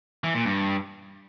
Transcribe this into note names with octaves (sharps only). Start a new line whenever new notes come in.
E3
A#2
G2